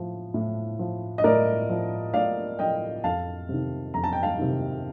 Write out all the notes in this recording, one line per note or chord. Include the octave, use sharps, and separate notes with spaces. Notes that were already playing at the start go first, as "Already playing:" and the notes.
Already playing: A2 F3
A2
F3
D#5
A2 A#4 D5
F3
A2 D5 F5
F3 D#5 G5
F2 F5 A5
C3 D#3
F2 A#5
A5
G5
F5 A5
C3 D#3